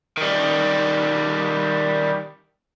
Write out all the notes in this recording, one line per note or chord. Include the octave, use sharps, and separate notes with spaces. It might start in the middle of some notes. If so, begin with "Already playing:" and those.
D#3 G3